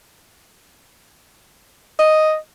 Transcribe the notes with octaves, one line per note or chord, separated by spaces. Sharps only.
D#5